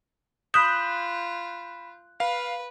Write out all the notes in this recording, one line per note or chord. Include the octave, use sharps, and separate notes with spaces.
F4 B5 D#6 F#6 G6 B6 E7
B4 F5